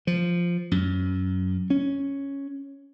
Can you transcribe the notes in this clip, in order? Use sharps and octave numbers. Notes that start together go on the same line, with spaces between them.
F3
F#2
C#4